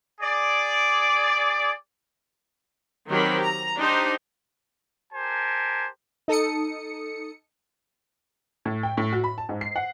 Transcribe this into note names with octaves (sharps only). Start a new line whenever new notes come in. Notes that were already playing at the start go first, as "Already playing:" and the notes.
G#4 D5
D#3 F#3 C4 G4 A#4 B5
A#5
D4 D#4 G4 C5
G4 A#4 C5 G#5 A5
D#4 A4 D#6 C#7
A2
G5
A2
F#4
B5
A5
G#2
C7
F#5